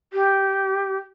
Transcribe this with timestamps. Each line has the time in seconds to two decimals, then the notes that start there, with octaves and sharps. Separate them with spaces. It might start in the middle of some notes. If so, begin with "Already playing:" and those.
0.13 G4